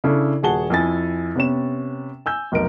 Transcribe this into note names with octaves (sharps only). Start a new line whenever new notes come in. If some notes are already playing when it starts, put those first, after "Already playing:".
C#3 D4 E4 A4
D#1 F#4 G#4 F#5 A5 G7
F2 E4 G#5 A6
C3 B3 C#4 E7
G#5 E6 G6
F1 B1 A#4 D7